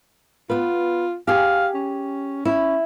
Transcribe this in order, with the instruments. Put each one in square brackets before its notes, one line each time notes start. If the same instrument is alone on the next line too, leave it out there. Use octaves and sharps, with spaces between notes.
[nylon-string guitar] B3 B4 [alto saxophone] F4
[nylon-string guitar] G4 G#4 [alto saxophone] F5
[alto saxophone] C#4
[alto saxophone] C#4 [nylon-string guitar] E4